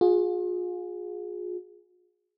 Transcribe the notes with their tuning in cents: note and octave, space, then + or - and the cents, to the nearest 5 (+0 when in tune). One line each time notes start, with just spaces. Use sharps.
F4 +40 G#4 +0